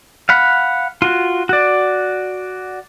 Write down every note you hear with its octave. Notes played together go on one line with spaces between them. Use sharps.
F5 F#5 B5
F4 F#4
F#4 D5